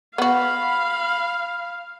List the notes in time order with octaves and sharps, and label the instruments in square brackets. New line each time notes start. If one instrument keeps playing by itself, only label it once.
[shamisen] B3 F#4 [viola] F5 [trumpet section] B5